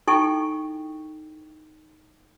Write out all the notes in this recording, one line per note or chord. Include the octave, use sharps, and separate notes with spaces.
D#4 E4 A4 G5 G#5 C#6